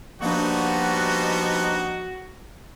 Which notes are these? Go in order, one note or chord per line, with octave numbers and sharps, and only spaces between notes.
F3 G3 A#3 B3 D4 D#4 F#4